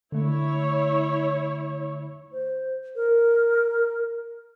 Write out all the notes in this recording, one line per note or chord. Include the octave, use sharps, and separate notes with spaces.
D3 A3 E4 C#5
C5
A#4